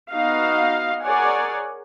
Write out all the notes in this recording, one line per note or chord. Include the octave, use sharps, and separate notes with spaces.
B3 D#4 F#4 D#5 F5
G#4 A#4 C#5 D5 F#5 G#5